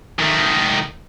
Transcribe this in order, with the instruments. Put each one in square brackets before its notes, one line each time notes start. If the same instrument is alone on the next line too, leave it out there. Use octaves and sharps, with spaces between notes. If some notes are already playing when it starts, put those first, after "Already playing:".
[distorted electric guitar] D#3 A3